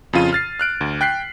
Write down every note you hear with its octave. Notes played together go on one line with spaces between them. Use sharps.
F2 C#3 F4 D#7
F6 A6 C7
F6 F#6 D7
D2
G5 F#6 B6 C7